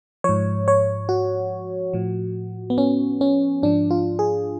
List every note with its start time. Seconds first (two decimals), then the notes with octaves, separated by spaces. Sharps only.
0.24 G#2 F3 C#5
0.68 C#5
1.09 F#4
1.93 A2 F3
2.70 B3
2.78 C#4
3.21 C#4
3.63 G#2 F3 D4
3.91 F4
4.19 G#4